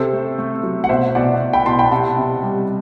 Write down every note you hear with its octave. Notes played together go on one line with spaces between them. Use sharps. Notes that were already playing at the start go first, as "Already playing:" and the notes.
Already playing: C3 A4 C5
A3
A3
F#3
F#5
B2 C5 E5
B2 D5 F#5
B2
G5 B5
B2 A5 C6
G5 B5
C3 F#5 A5
C3
G3